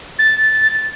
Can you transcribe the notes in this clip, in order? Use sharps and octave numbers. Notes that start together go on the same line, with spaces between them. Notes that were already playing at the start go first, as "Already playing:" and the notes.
A6